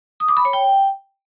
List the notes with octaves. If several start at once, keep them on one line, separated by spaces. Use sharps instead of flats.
D#6
D6
B5
C#5
G5